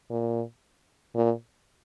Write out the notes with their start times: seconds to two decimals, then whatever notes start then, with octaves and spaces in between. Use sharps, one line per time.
0.10 A#2
1.15 A#2